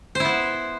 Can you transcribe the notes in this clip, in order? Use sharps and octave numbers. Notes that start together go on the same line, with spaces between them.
B3 E4 C5